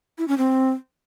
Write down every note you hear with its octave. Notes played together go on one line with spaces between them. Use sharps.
E4
C#4
C4